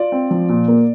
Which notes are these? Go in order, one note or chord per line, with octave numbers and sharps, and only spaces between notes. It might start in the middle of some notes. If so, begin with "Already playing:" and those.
Already playing: F4 D5
C4
F3
A#2
A#3